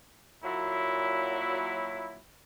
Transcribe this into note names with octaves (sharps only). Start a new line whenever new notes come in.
A#2 F#3 E4